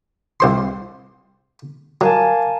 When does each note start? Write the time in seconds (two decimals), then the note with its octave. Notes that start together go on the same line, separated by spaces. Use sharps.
0.40 C2 C5 C6
2.01 F#3 A#3 G#5 A5